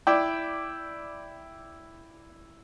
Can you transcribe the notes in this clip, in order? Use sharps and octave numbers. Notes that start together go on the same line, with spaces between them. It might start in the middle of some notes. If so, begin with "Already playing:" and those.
E4 D5 G5